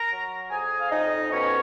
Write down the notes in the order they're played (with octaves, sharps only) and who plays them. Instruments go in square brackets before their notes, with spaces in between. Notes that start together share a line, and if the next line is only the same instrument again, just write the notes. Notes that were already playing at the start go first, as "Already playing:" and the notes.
Already playing: [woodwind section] A#4 A#5
F#3
F2 G#4 G#5
F5
F2 D#4 D#5
B2 C#4 C#5